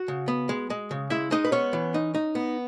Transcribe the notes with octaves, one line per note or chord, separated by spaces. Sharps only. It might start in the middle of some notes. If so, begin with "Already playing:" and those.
Already playing: F#4 F#5
C#3
B3
G#3
G#3
C#3
G#3 E4 E5
G#3 D#4 D#5
B4
B3 C#4 C#5
E3
D#4
D#4
B3